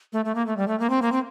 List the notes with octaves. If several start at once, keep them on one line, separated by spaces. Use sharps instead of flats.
A3
A3
A#3
A3
G3
A3
A#3
C4
A#3
C4